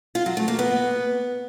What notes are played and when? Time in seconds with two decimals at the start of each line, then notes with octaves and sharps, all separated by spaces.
0.15 F4
0.26 F#3
0.37 A3
0.48 A#3
0.59 B3